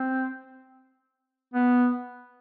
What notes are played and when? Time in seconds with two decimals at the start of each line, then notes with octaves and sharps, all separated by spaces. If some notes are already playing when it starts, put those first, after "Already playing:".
Already playing: C4
1.54 B3